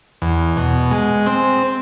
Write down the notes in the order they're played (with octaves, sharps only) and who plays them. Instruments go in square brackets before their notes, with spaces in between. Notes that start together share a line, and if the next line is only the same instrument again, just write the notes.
[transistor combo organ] E2
B2
G#3
C4